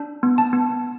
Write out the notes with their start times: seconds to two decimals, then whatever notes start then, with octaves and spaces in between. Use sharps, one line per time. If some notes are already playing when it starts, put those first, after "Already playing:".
Already playing: D4
0.23 B3
0.38 A5
0.53 B3